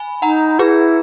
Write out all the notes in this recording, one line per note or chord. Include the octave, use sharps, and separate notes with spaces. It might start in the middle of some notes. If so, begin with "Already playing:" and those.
Already playing: G#5 B5
D#4 F#5 A#5
E4 F#4 G#4 B4